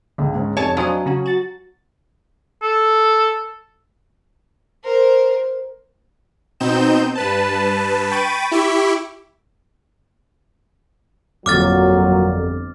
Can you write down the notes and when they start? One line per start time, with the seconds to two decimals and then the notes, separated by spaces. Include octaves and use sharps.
0.18 C#2 G#2 D3
0.35 G#2 C#4
0.57 F1 C#5 A5
0.77 F#3 D4 C5 D#5 F5 G#5 D#6
1.06 C#3 C#4 F#4
1.26 F#4 A6
2.62 A4
4.84 A#4 C5
6.60 B2 C4 D#4 G6 E7
7.15 G2 B4 A5
8.11 G5 B5 C#6 A6 D7 D#7
8.51 E4 G4 E5 B5 C#6 D6
11.46 G1 F2 A#2 F#3 D6 F6 A6